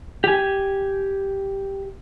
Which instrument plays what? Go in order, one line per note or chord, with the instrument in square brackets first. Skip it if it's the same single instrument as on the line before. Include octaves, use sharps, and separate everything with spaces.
[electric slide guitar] G4 G#5